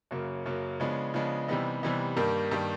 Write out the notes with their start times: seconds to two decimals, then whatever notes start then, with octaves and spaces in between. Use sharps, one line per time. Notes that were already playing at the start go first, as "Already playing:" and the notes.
0.11 F#2 C#3 F#3 A#3
0.46 F#2 C#3 F#3 A#3
0.80 C#3 F3 G#3 B3 D4
1.14 C#3 F3 G#3 B3 D4
1.48 C3 E3 G3 B3 D#4
1.83 C3 E3 G3 B3 D#4
2.17 G2 D#3 G3 A#3
2.51 G2 D#3 G3 A#3